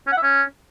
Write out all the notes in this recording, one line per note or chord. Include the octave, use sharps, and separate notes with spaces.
C#4
F#5
E5
C#4